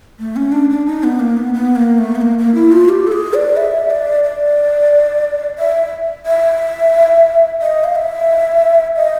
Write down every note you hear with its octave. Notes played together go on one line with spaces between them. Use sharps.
A3
C#4
D4
D4
D#4
B3
A#3
B3
B3
A#3
A3
B3
A#3
A#3
E4
F4
G4
A4
G#4
D5
E5
D5
D5
E5
E5
D#5
F5
E5
D#5